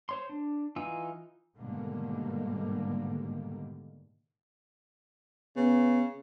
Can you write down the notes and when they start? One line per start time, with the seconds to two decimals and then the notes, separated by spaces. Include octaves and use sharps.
0.09 C5 C#5 C6
0.29 D4
0.76 E3 D#4 F4 G#5 E6
1.55 G#2 B2 D3 D#3 G3 A#3
5.56 C#3 B3